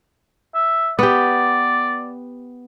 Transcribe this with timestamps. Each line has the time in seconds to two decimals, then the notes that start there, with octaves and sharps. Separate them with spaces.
0.55 E5
0.99 B3 G4 D5